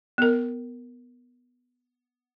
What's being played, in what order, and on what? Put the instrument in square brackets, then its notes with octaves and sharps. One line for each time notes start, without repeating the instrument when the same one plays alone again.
[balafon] B3 A#4